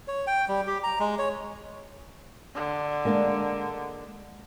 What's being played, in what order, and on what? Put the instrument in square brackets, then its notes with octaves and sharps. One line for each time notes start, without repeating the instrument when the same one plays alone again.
[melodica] C#5
G5
G3
G4
A#5
G#3
C#5
[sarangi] D3
[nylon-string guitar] G#3 A#3 D4